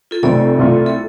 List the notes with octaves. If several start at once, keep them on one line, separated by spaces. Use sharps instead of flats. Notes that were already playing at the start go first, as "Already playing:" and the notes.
F4 A4
F1 F2 C3 A3 C4 A4 D5
C2 C3 A3 F4
A4